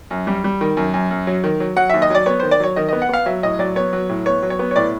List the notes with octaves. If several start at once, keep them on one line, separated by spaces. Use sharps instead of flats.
F#2
G3
G3
D#3
F#2
F#2
F#2
F#3
D#3
F#3
F#3 F#5
D#2 E5
D#5
F#3 D5
B3 C#5
D#3 C5
D5
F#3 C#5
D#3 D#5
B3 D#5
F#5
B3 F5
F#3 E5
A2 D#5
F#3 D5
B3 C#5
F#3
A2
B3 C#5
F#3
C#5
B3
C#5
A2 D5